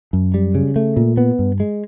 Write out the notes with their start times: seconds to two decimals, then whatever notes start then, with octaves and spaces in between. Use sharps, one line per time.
0.13 F#2
0.34 G3
0.55 C#3
0.76 A3
0.97 A#2
1.17 B3
1.39 G2
1.60 G#3